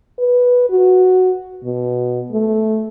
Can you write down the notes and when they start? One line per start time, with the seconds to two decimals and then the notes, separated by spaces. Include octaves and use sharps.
0.19 B4
0.70 F#4
1.64 B2
2.32 A3